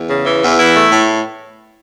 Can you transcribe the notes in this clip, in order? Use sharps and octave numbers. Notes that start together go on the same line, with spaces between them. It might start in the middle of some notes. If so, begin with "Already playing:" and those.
Already playing: E2
C#3
E3
E2
E3 E4
A3
A2